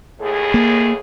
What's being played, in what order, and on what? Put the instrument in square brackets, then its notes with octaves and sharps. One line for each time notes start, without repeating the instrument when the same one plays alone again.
[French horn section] D#2 A2 G#4
[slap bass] A#3